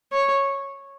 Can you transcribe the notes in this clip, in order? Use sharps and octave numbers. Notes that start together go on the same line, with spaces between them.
C#5